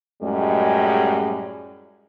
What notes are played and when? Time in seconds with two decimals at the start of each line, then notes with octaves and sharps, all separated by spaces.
0.22 F#2 A2 G3 G#3